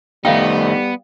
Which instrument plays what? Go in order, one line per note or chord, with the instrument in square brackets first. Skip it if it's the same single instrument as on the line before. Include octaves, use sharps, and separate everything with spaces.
[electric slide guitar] D#3 A3 D#4 [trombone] G3 [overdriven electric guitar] B3 [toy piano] F5 G5